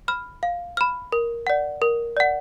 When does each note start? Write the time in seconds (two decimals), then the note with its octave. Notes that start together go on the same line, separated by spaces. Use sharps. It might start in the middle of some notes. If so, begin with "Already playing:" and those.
0.08 B5 F6
0.43 F5
0.77 B5 F6
1.12 A#4
1.47 D5 F#5
1.82 A#4
2.17 D5 F#5